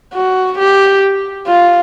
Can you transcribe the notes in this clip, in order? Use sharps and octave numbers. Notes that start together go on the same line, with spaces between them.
F#4
G4
F4